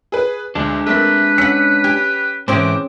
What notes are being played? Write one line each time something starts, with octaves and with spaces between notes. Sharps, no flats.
G#4 B4
D2 G#3 D4
A3 C4 A#4 B4
C#4 F#5 E6 B6 C#7
G4 G#5
G#2 E3 C4 C#4 G#4 C5 G5 D6